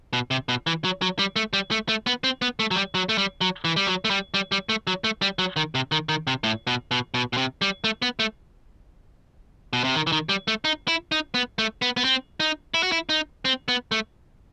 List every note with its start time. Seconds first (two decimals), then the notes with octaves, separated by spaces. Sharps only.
0.13 B2
0.31 C3
0.49 B2
0.67 E3
0.84 F#3
1.02 F#3
1.19 G3
1.36 A3
1.53 G3
1.71 A3
1.89 A3
2.07 B3
2.24 C4
2.42 B3
2.60 A3
2.71 F#3
2.76 G3
2.95 F#3
3.09 A3
3.18 G3
3.41 F#3
3.65 E3
3.76 G3
3.87 F#3
4.05 A3
4.10 G3
4.34 G3
4.52 G3
4.69 A3
4.87 F#3
5.04 A3
5.22 G3
5.39 F#3
5.56 D#3
5.75 C3
5.92 D#3
6.09 D#3
6.27 C3
6.44 A2
6.67 B2
6.91 B2
7.14 B2
7.33 B2
7.37 C3
7.62 G3
7.84 A3
8.02 B3
8.19 A3
9.73 B2
9.84 C3
9.95 D#3
10.07 E3
10.12 D#3
10.29 G3
10.48 A3
10.65 D#4
10.88 E4
11.12 D#4
11.34 B3
11.59 A3
11.82 B3
11.97 B3
12.04 C4
12.40 D#4
12.74 E4
12.83 F#4
12.92 E4
13.09 D#4
13.45 C4
13.68 B3
13.92 A3